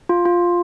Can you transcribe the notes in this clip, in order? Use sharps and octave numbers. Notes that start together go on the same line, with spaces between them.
F4
F4